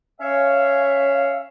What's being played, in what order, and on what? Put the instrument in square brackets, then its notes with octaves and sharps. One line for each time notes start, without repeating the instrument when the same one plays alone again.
[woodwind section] C#4 C#5 E5 F5